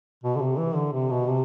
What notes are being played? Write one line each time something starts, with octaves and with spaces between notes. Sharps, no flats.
B2
D3
C3
E3
D3
C3
B2
C3